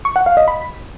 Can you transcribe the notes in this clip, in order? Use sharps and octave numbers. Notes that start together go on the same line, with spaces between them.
C#6
F#5
F5
D#5
B5